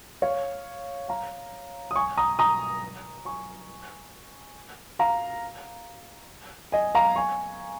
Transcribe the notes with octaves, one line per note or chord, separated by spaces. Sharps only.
C#5 F5
F5 A#5
D#6
G#5 C#6
A#5 D#6
A#5 D#6
G#5 C#6
F5 A#5
D#5 G#5
F5 A#5
G#5 C#6